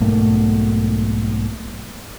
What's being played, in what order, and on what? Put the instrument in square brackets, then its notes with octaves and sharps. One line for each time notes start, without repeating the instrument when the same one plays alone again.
[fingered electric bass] B1 G#2 A3 A#3